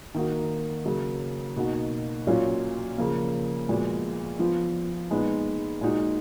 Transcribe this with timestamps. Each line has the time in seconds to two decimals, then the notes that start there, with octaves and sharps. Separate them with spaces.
0.14 D#3 A#3 D#4 F#4
0.85 C#3 F#3 A#3
1.56 B2 A#3 D#4 F#4
2.27 A#2 F#3 C#4 F4
2.98 C#3 F3 A#3
3.68 A#2 F3 G#3 B3 F#4
4.39 F3 B3 F4
5.11 A#2 G#3 B3 D#4
5.81 A#2 G#3 D#4 F#4